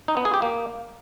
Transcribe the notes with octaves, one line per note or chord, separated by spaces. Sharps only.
D#4
B3
G#4
G4
A#3